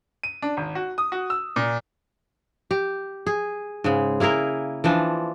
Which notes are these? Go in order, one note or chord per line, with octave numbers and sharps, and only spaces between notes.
D#7
D4
G#1
F#4
D#6
F#4
E6
A#2
G4
G#4
G#2 C#3 G#3
A#3 E4 G#4 A#4
E3 F3 D4